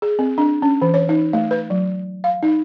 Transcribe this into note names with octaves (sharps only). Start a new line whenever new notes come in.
G#4
C4
D4
C#4
E3
C#5
D#4
A3
B4
F#3
F5
D#4